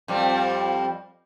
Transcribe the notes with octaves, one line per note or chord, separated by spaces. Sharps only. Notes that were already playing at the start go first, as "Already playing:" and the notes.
F2 G3 C4